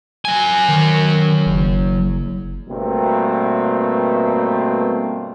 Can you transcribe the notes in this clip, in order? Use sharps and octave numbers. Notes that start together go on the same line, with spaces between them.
F#3 G#5
D#3
F#1
G2 B2 A3 A#3 C4